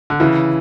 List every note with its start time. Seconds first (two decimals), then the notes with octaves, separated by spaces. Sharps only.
0.10 D3
0.20 C#3 E3